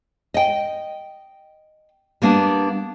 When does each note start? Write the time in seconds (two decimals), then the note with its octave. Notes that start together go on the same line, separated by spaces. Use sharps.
0.34 D#5 G5
2.22 G3 A#3 B3 D4